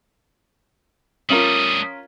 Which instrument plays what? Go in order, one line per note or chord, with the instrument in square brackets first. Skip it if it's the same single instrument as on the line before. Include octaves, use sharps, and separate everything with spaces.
[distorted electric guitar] G3 A3 [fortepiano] C#4 F4 A#4 [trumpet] D#6